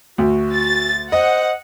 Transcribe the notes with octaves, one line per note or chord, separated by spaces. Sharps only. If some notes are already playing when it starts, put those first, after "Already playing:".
D2 F#4
A6
C5 D#5 F#5